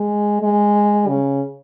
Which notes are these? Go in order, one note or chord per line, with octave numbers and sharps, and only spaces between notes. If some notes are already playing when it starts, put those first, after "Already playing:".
Already playing: G#3
G#3
C#3